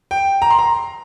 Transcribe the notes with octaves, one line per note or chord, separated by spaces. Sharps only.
G5
A#5
C6
A#5